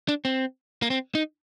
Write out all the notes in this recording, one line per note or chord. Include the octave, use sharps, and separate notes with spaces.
D4
C4
A#3
C4
D#4